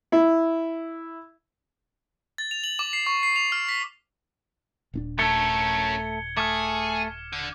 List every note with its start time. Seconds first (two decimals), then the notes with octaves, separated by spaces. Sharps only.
0.12 E4
2.38 A6
2.51 F7
2.64 F#7
2.79 D6
2.93 C7
3.06 C#6
3.23 C7
3.36 F7
3.52 F6
3.69 B6
4.94 D#1 C4 D4
5.19 A3 C#4 A4 A#4 G#6 C#7 G7
6.37 A3 G#4 D6 F6
7.33 D3